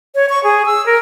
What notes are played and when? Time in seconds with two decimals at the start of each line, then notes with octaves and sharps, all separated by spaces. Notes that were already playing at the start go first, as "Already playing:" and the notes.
0.15 C#5
0.30 C#6
0.44 G#4
0.66 E6
0.86 A#4